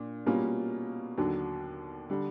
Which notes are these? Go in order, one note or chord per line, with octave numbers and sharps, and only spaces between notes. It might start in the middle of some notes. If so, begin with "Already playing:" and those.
Already playing: A#2 D4
B2 G3 A#3 C#4 F4
D#2 D3 F#3
D3 G3